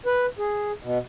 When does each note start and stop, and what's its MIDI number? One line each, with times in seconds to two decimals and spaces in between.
0.06 0.26 71
0.38 0.72 68
0.83 0.98 47